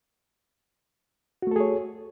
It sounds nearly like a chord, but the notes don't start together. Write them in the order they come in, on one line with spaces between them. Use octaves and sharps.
F#4 A3 A4 G#4 C#5